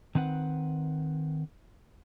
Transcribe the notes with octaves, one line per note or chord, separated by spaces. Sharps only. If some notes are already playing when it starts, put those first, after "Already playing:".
D#3 C4 B4 F#5